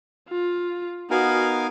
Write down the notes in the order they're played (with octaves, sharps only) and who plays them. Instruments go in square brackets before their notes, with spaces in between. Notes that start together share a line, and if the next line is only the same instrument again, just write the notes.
[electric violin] F4
[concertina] B3 D#4 A#4 F5 G#5 [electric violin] F#4